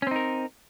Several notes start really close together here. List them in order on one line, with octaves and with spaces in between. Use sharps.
C#4 C4 D#4 A#4